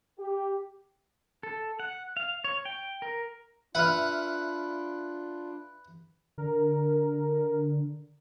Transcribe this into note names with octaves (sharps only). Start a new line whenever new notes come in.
G4
A4
F#5
F5
C#5
G5
A#4
D4 F4 B4 E5 F#5 F6
D3 A#4